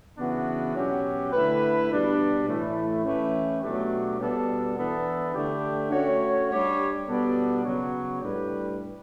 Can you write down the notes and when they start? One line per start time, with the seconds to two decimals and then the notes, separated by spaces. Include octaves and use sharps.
0.18 C#3 E3 B3 D4 F#4
0.75 B2 F#3 C#4 G4
1.32 D3 A3 E4 B4
1.90 B2 G3 D4
2.47 A2 E3 A3 E4 A4
3.04 E3 A3 C#4 G4 B4
3.62 B2 F#3 A3 D4 G4
4.19 B2 G3 B3 D4 A4
4.77 E3 B3 D4 A4
5.34 D3 A3 D4 G4
5.91 A3 C#4 F#4 C#5
6.50 G3 D4 G4 C#5
7.06 B2 G3 B3 D4 A4
7.63 C#3 F#3 B3 F#4 C#5
8.21 A2 G3 D4 G4 B4